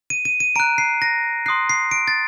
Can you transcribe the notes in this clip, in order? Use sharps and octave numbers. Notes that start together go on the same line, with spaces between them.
D#7
D#7
D#7
A#5 F#6 D7
C7
A#6
C6 D#6 F#6 C7
C7
D7
A6